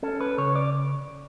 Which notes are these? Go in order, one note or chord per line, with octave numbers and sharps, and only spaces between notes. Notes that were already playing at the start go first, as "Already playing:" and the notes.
C#4 A4
B4
C#3 C#5
D5